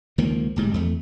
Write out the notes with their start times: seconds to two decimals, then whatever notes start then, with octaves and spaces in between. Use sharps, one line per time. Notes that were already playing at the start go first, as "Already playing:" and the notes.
0.18 C#2 D#3 F3 A#3
0.56 D1 G#2 G3
0.74 E2 A3